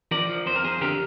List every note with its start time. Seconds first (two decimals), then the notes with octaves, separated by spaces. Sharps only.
0.11 F3 A#4 D5
0.29 F3
0.46 F2 C5
0.55 A#4
0.64 F2 G#4 C5
0.81 D3 G4 A#4